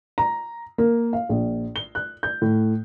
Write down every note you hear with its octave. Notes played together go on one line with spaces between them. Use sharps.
A#5
A#3
F5
A#1
G7
F#6
G6
A2